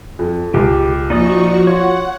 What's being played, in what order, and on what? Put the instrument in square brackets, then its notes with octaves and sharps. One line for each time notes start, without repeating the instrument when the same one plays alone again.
[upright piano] F2
[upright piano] C#2 [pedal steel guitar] G4
[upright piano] A#1 [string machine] F3 F#4 C#6 [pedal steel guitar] D#4 D5 D#6
[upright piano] F4 [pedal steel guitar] C#5 [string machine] F#5